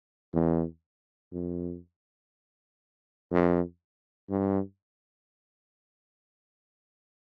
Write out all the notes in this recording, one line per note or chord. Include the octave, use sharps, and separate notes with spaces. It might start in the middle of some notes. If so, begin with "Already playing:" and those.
E2
F2
F2
G2